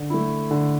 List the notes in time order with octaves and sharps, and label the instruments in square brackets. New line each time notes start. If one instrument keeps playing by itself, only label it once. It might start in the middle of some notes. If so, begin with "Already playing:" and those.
Already playing: [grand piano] D3
A3 E4
D3